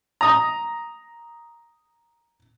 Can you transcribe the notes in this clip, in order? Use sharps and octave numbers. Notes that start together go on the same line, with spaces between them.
A#5 D#6